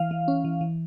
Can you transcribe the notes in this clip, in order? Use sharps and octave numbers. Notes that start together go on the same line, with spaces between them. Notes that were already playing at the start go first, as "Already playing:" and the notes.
Already playing: E3 F5
E3
C#4
E3
E3